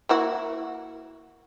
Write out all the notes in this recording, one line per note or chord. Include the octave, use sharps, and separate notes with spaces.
A#3 E4 F#4